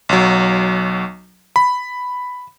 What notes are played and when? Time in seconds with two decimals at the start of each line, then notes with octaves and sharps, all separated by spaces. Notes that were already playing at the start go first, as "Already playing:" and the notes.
0.09 B1 F#3
1.56 B5